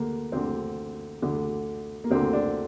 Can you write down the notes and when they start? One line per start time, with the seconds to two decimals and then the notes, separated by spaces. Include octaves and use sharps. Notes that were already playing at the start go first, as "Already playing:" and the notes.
Already playing: D2 D3 A#3
0.32 D2 D3 C4
1.22 D2 D3
2.04 A#3
2.11 D2 D3 C4
2.33 D4